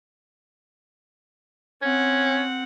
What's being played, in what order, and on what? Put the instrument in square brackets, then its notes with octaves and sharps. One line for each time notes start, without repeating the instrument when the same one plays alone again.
[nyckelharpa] C4 F#5 [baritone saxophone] C#4